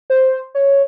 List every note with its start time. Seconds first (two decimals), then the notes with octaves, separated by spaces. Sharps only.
0.10 C5
0.55 C#5